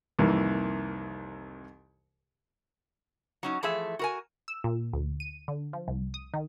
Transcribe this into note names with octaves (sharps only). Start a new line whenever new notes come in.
C2 F2 D#3 E3 A#3
F#3 C#4 D#4
E3 F3 A3 G#4 E5
F#4 A#4 G#5
E6
A#2
D2
D#7
D3
F3
C2
D#6
D#3